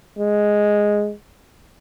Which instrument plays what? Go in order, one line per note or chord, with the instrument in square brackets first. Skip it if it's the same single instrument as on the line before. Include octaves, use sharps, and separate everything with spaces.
[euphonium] G#3